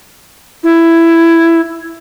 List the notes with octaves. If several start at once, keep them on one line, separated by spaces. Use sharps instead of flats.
E4